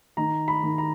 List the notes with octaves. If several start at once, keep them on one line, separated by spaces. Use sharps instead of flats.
D#3 A#5
B5
D#3
A#5